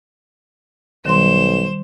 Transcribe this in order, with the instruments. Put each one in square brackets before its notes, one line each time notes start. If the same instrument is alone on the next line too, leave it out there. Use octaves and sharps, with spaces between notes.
[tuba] B1 [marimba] D#3 G3 C6 [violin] C5 E7